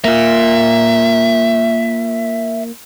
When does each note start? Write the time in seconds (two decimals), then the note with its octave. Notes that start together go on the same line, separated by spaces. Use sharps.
0.05 A#3 F4 E5